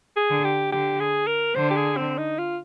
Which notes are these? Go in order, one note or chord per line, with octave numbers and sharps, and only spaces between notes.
G#4
D3
G4
D3 G4
G#4
A#4
D3 C5
G4
G#4
C4
D#4
F4